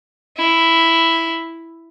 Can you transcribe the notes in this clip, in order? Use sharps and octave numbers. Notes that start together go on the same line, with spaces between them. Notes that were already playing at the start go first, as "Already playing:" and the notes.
E4